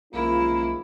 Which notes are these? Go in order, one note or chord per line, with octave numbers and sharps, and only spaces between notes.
B1 D#3 F3 G#3 A#3 C#4 E4 F4